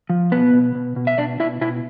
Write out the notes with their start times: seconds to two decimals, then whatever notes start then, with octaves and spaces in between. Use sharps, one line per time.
0.10 F3
0.31 B2 B3 B4
0.53 B2
0.75 B2
0.96 B2
1.07 E5
1.18 B2 D4 D5
1.40 B2 E4 E5
1.61 B2 E4 E5